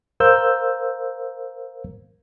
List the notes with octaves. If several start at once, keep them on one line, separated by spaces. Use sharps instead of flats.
A#4 C5 F5 E6 G6